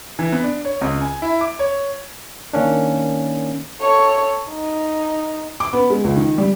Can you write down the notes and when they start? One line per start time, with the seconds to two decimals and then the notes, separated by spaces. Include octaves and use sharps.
0.19 E3
0.32 B3
0.44 D4
0.65 C#5
0.81 C#2
1.01 G#5
1.22 E4
1.41 D6
1.59 C#5
2.53 D#3 A#3 C#4 D4
3.81 A4 C#5
4.49 D#4
5.60 D6
5.73 B3
5.90 G#3
6.04 C#2
6.16 D#3
6.38 G3